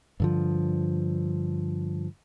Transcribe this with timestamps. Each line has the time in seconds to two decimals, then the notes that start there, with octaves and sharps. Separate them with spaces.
0.20 G2 D3 F3